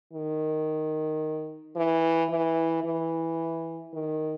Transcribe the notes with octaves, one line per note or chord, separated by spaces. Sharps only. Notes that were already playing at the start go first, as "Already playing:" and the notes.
D#3
E3
E3
E3
D#3